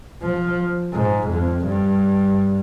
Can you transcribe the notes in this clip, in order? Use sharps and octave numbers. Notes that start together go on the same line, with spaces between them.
F3
G#2
F2
G2